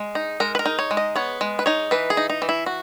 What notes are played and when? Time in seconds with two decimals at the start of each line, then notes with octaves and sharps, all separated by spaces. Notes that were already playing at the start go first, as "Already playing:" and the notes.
Already playing: G#3
0.15 D#4
0.40 G#3 A#4
0.55 B4
0.59 A#4
0.66 D#4
0.79 C#5
0.91 G#3
0.97 D#5
1.16 B3 C#5
1.41 G#3
1.59 B4
1.66 D#4 C#5
1.91 E3 B4
2.10 G#4
2.17 D#4
2.30 D#4
2.42 E3
2.49 E4
2.66 F#4